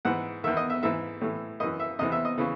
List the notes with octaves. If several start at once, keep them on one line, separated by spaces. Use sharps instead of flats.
G#2 E3 F#5
E2 D#3 E5
D#5
E5
G#2 E3 E5
A2 E3
F#2 E3 D#5
E5
E2 C3 E3 D#5
E5
D#5
C#3 E3